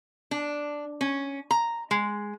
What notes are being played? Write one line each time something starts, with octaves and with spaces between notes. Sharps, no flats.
D4
C#4
A#5
G#3